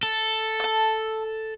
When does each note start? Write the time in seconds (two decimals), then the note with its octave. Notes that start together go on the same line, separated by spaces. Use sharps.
0.03 A4
0.60 A5 E6